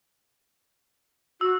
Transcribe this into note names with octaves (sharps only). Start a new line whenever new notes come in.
F#4 E6